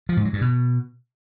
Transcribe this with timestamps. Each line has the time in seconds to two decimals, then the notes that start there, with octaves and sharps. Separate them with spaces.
0.09 F3
0.17 G#2
0.25 F#3
0.33 G2
0.41 B2